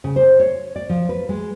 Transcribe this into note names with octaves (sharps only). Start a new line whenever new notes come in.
C#3
C5
C#5
D5
F3
B4
G#3